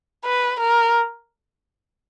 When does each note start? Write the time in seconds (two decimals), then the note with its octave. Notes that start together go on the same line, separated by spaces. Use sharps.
0.25 B4
0.60 A#4